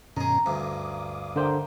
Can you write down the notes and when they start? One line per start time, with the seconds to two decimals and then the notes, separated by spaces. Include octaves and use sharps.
0.17 G2 B2 D#3 C#4 G#4 A#5
0.46 D2 G2 F5 D6 D#6
1.36 D3 A#3 C5 E5 G5